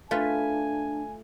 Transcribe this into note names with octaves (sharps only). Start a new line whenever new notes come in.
A3 D4 F4 B4 G#5